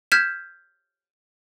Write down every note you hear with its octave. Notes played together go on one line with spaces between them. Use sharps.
F6 G6 G#6 B6 E7